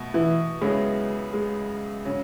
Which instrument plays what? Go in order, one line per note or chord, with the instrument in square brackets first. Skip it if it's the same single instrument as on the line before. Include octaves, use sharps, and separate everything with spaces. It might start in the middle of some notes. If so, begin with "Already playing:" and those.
Already playing: [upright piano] B2 A3
[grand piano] E3
[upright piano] C#2 C#3 F#3 B3 E4 [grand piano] G#3
[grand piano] G#3
[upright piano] C#3 F#3